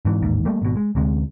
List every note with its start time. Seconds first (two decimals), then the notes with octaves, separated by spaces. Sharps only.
0.05 G#2 E3
0.22 A1 D#2 G#2
0.45 G3 A3 A#3
0.62 G#1 B2
0.77 G#3
0.95 D2 C3 G#3